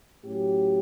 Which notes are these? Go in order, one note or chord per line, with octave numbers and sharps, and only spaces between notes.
A2 F#3 C#4 G4